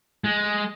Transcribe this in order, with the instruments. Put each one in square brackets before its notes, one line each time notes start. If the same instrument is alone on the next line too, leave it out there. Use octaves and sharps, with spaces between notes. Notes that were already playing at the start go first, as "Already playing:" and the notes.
[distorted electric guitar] G#3